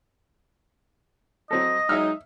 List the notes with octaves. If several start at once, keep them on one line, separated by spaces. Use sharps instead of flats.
F#3 C4 A4 D#5 A#6
F#3 G#3 D#4 E5 E6 F6